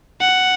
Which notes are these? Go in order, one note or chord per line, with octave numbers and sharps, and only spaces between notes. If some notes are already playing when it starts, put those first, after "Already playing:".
F#5